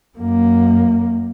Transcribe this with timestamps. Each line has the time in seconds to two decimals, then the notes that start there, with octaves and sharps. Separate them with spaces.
0.18 F#2 A#3